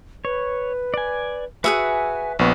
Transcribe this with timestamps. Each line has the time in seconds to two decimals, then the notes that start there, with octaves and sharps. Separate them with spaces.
0.25 B4 C#5
0.94 D5 G#5
1.64 F#4 G#4 B4 E5 F#5 G#5 E6
2.39 A#1 B3 C#6